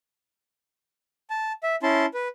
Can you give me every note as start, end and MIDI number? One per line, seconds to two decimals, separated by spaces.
1.30 1.52 81
1.63 1.76 76
1.83 2.06 61
1.83 2.06 64
1.83 2.06 81
1.83 2.06 84
2.14 2.28 71